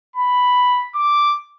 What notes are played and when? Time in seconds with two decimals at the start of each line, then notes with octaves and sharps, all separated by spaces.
0.16 B5
0.95 D6